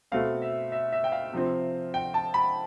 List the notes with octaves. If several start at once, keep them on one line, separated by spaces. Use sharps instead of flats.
B2 A3 C4 F5
E5
E5
E5
G5
F5
C3 F3 C4
G5
A5
B5